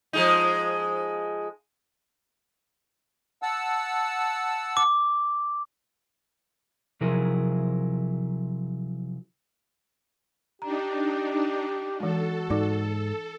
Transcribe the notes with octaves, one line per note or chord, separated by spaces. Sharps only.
F3 G#3 D#4
F#5 A5 E6
D6
C3 F3 F#3 E4 G#4 A#4
D4 D#4 G4 A#5
E3 G#3 F#4 A4
G#2 D#4 D5 D6